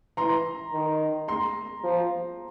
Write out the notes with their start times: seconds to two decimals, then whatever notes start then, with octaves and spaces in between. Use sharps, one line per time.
0.17 E3 A#5 C6
0.72 D#3
1.28 A#5 C6
1.84 F3